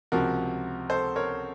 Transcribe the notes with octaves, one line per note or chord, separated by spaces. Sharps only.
C#2 C3 F3 F#4 A#4
A4 C5
A#4 C#5